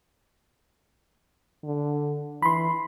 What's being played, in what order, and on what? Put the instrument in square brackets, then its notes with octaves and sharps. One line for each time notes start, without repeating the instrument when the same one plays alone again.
[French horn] D3
[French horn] E3 [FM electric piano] B5 C6